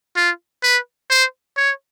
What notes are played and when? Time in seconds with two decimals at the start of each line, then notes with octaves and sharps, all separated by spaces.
0.16 F4
0.63 B4
1.10 C5
1.57 C#5